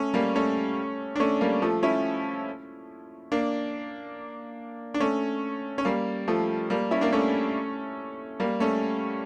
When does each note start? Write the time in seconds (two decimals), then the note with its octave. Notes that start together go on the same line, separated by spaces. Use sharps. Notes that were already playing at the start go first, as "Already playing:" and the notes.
Already playing: A3 C#4
0.14 G3 A#3
0.35 A3 C#4
1.16 D4
1.20 A3 C#4
1.41 G3 A#3
1.62 F3 A3
1.83 C#4 E4
3.32 A#3 D4
4.94 D4
5.00 A3 C#4
5.78 C#4
5.85 G3 A#3
6.28 F3 A3
6.70 G3 A#3
6.91 C#4 E4
7.01 A#3 D4
7.12 A3 C#4
8.40 G3 A#3
8.60 A3 C#4